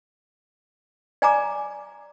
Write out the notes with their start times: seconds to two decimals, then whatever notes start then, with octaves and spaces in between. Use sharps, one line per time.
1.22 D5 G#5 A#5 D6